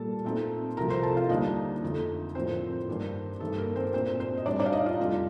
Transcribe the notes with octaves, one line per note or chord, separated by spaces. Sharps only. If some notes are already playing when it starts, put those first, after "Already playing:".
Already playing: A#2 G3 A#3 A4 A5
A#2 A3 C4 D#4
C2 C3 F3 A3 A#4 A#5
C5 C6
A4 A5
F4 F5
D#2 D3 G3 D4 D#4 D#5
F2 D3 A3 D#4
A2 F3 A#3 C4 D4 C5
G2 D#3 A#3 D4
G2 D#3 A3 D#4 A4
A#3 A#4
C4 C5
A#2 A3 C4 D4 C5
C4 C5
D#5
A2 G3 D4 D5
D4 D5
F5
D#4 D#5
F4 F5
F2 C3 G3 D4